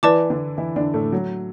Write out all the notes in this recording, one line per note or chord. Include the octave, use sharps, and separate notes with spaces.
E3 E4 B4 D5 A5 D6
D3 D4
E3 E4
D3 D4
A2 A3
F#3